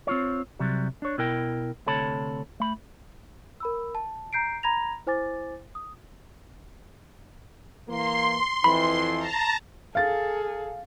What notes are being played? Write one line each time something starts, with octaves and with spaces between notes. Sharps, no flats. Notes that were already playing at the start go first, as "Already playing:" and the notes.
C4 F4 C#5
C3 F#3 G3
D4 C#5
B2 E4 A#4 G5
D2 C3 A4 C#5 A5 B5
A3 B5
A#4 B5 E6
A5
A#5 G6 C7 D7
A#5 B5 G#6 A#6 F7
E4 C5 G#5 D6 A6
D#6
E3 A#3 C6
F2 E3 B5
A5 A#5
G#4 A4 F5 A6